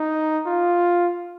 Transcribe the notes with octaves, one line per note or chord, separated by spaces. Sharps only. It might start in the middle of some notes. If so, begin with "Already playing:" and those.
Already playing: D#4
F4